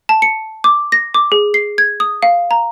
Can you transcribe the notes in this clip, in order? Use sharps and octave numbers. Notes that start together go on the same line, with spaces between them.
A5
C#7
D6
A#6
D6
G#4
C7
G#6
D#6
F5
A#5